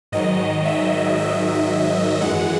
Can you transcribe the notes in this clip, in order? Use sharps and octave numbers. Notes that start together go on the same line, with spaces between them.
G#2 D#3 F#3 D#5
E5
E5
F#2 E3 G#3 F#5